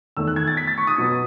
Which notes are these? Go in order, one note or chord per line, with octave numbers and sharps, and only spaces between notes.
E2 D#3 A3 E6
F#6
G#6
A6
B6
A6
C#6
D#6
B2 F#3 B3